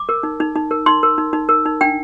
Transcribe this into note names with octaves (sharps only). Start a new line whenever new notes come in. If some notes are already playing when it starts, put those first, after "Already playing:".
Already playing: D6
A#4
D#4
D#4
D#4
A#4
D#4 C6
A#4
D#4
D#4
A#4
D#4
D4 G5